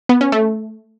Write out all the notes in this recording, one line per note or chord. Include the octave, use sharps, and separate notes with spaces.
B3
C#4
A3